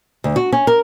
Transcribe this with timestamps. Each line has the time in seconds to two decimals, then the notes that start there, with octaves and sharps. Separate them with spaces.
0.24 D2
0.36 F#4
0.53 C#4
0.67 A#4